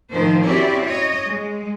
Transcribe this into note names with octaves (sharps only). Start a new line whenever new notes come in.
A2 D#3 F3 C5
C4 C#4 E4 F#4 G4 D5
C#5 D#5
G#3